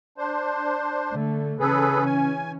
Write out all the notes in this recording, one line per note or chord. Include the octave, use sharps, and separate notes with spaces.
D4 C5
D3 A3
C#3 E3 C#4 G#4 A4 B4
G#5